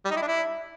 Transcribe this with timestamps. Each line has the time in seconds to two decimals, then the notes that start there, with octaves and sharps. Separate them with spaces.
0.05 G3
0.11 D#4
0.17 E4
0.22 D4
0.28 E4